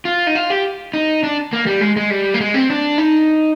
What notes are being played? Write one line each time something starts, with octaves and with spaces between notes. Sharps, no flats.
F4
D#4
F4
G4
D#4
D4
A#3
G3
G#3
G#3
G3
A#3
G#3
C4
D4
D#4